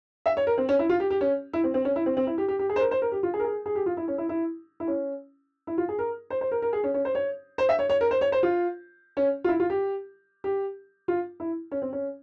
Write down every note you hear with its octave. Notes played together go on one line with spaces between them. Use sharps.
E5
C#5
A#4
C4
C#4
E4
F4
G4
G4
C#4
E4
C4
C4
C#4
E4
C4
C4
E4
G4
G4
G4
G#4
C5
A#4
C5
A#4
G4
F4
G#4
A#4
G#4
G#4
G4
F4
E4
C#4
E4
E4
E4
C#4
E4
F4
G#4
A#4
C5
C5
A#4
A#4
G#4
C#4
C#4
C5
C#5
C5
E5
C#5
C#5
A#4
C5
C#5
C5
F4
C#4
F4
E4
F4
G4
G4
F4
E4
C#4
C4
C#4